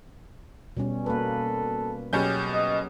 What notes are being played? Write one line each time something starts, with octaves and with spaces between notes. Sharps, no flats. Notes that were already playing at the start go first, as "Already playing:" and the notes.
B2 G3 C#4
A#3 A4 B4
B2 F#3 C#4 G4 G#4 G6
D#5